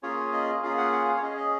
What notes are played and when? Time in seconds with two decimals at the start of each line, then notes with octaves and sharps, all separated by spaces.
0.03 A#3 C#4 F4 G#4 C#5
0.33 D#5
0.63 A#3 C#4 F4 G#4 F5
0.78 F#5
0.93 F#5
1.08 F5
1.17 C#5
1.22 C#4 G#4 D#5
1.37 D#5